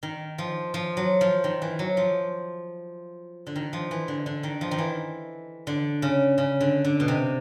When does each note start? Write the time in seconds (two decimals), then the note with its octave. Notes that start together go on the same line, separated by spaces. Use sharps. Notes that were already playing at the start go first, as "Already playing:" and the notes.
0.03 D#3
0.38 F3
0.74 F3
0.97 F#3
1.21 F3
1.44 D#3
1.62 E3
1.79 F#3
1.97 F3
3.47 D3
3.56 D#3
3.73 F3
3.91 E3
4.08 D3
4.26 D3
4.43 D#3
4.61 F3
4.71 D#3
4.78 E3
5.67 D3
6.02 C#3
6.38 C#3
6.61 D3
6.85 D3
7.00 B2
7.08 C3